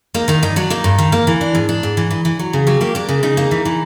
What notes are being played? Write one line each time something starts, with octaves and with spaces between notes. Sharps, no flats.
A#3 D#4
D#3 D#4
G2 D#4
F#3 D4
A#3 D#4
G2
D#3
A#3
E3
D4
G#2
D4
G#2
E3
E3
E3
F#3
C#3
F#3 G4
A#3 G4
A#3 D4
C#3
C#3 D#4
A#3
E3
E3